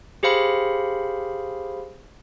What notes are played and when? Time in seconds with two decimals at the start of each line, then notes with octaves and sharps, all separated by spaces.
0.23 G4 G#4 C5 F5 B5